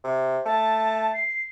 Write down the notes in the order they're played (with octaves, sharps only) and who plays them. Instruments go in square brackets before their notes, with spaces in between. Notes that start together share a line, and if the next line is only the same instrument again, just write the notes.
[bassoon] C3
[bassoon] A3 [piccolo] A5
[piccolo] C7